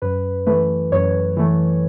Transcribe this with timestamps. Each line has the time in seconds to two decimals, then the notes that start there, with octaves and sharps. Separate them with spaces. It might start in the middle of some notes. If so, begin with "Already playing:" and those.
0.02 F#2 B4
0.47 E3 A3 B4
0.92 F#2 C#5
1.37 E3 A3